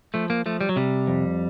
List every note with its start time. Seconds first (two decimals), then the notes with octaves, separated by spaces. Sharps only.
0.14 F3 A3
0.30 A#3
0.46 F3 A3
0.61 G3
0.69 F#3
0.76 C3 G3
1.08 F2